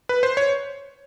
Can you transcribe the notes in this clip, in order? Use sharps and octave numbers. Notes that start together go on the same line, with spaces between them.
B4
C5
C#5